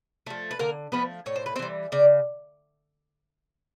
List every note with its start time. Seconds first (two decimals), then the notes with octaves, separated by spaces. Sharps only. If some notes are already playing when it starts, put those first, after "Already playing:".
0.26 F3 A3
0.51 B4
0.59 D3 A#3 A#4
0.92 F3 A3 B3 B4
1.26 A2 C#5
1.36 C5
1.46 B4
1.56 C4 C5
1.59 E3 G3
1.92 C#3 D5